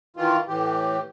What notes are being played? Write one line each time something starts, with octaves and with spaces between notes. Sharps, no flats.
D#3 E3 F4
A2 E3 G4